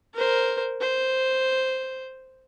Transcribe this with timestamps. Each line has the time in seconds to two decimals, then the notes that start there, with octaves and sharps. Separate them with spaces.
0.14 A#4 C5
0.81 C5